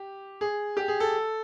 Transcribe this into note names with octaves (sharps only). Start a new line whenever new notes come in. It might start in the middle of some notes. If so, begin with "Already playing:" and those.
Already playing: G4
G#4
G4
G#4
A4